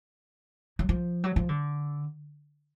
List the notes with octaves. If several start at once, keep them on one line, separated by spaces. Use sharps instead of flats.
F#3
F3
F#3
F3
D3